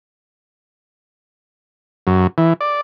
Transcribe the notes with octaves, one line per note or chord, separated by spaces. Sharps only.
F#2
E3
D5